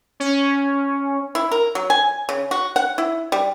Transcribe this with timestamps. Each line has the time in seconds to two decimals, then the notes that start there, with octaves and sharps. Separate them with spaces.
0.20 C#4
1.35 E4
1.51 A#4
1.75 F#3
1.90 G#5
2.29 C#3
2.51 F#4
2.76 F#5
2.98 E4
3.32 G3